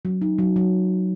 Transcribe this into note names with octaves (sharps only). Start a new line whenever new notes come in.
F#3
D#4
F#3
F#3